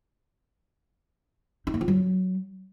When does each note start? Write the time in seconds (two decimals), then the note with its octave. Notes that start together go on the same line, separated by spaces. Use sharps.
1.67 D#4
1.74 A#3
1.81 F4
1.88 F#3